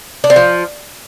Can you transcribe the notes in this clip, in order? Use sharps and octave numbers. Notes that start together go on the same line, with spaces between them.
D4
C4
F3